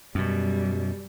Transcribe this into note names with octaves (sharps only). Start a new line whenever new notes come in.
F#2 B2 G3